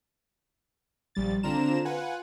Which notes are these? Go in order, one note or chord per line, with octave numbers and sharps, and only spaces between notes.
A#1 G3 A6
D3 C4 D4 F4 A#5 E7
F4 B4 F#5 G#5